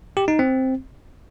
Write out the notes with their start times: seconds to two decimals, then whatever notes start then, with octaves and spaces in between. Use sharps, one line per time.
0.17 G4
0.28 D#4
0.39 C4